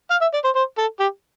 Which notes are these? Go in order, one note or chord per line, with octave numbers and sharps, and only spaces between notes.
F5
E5
D5
C5
C5
A4
G4